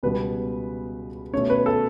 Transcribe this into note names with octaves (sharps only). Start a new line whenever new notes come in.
C#2 B2 G3 B3 B4
B2 A3 C#4 C#5
B4
A4